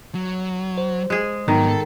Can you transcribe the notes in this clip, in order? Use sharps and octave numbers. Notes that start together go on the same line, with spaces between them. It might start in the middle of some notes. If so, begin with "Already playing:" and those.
F#3
C5
G#3 G#4
G#2 D#3 F#3 B3
A4